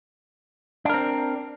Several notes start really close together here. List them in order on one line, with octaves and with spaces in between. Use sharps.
D4 A#4 C4